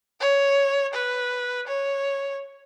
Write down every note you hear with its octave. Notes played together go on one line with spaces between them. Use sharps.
C#5
B4
C#5